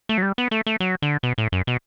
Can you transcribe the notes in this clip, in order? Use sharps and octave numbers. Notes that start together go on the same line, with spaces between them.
A3
F#3
G3
B3
A3
A3
F#3
D3
B2
A2
F#2
B2